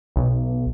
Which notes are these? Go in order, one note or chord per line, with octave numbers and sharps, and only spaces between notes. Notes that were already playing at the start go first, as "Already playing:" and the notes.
B1